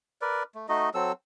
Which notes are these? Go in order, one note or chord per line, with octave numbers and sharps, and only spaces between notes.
A#4 B4 D5
A3
A3 D#4 F#4 D#5
F#3 C4 A4 E6